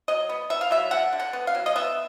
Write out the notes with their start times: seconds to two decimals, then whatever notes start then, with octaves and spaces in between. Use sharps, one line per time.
0.08 F#3 D#5
0.29 B3
0.50 B3 E5
0.61 F5
0.71 F#3 E5
0.91 D3 F#5
1.12 D3
1.20 F#5
1.33 B3
1.47 F5
1.55 F#3
1.66 D#5
1.76 B3 E5